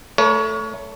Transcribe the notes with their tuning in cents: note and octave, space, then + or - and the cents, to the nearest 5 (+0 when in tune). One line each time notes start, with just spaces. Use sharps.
A3 +0 A#4 +40 C#5 +25